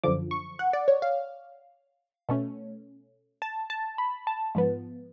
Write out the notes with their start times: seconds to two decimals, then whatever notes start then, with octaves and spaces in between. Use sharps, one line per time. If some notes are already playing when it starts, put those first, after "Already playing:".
0.03 F#2 D3 F3 D6
0.31 C#6
0.59 F#5
0.73 D5
0.88 C#5
1.02 F5
2.29 B2 A3 C#4
3.42 A5
3.70 A5
3.98 B5
4.27 A5
4.55 G#2 F3 B3